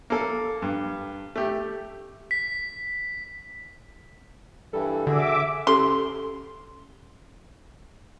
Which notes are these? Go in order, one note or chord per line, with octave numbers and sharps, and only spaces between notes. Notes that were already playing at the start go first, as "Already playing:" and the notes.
A#3 A4
G2
A3 G4
B6
G2 E3 G3 A4
D3 F#4 G#4 E5 D6
C#4 G4 A4 C6